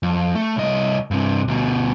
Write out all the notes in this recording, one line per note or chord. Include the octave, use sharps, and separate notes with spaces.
F2
A3
C2 D#5
G2 C3
D2 B2